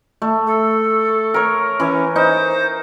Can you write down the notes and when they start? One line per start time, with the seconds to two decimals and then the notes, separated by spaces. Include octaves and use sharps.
0.22 A3
0.47 A4
1.34 A#4 C#5
1.80 E3 C#4
2.16 D#4 C5